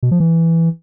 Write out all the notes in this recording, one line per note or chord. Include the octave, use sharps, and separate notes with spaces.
B2
F3
E3